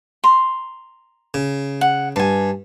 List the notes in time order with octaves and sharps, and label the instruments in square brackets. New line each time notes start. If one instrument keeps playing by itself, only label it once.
[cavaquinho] A#5 C6
[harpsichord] C#3
[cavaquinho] F#5
[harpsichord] G2 [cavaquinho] G#5 A5